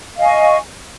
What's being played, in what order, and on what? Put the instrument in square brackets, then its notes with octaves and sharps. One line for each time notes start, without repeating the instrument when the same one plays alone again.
[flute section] F5
D#5
G#5
C#6